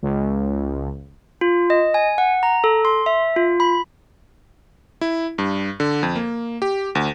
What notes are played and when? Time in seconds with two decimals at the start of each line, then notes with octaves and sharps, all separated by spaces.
0.02 C#2
1.41 F4
1.70 D#5
1.94 G#5
2.18 F#5
2.43 A#5
2.64 A4
2.85 C6
3.06 E5
3.36 F4
3.60 B5
5.01 E4
5.38 G2
5.80 D3
6.03 F2
6.15 A#3
6.62 G4
6.95 D2